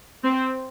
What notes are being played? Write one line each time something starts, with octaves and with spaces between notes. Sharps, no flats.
C4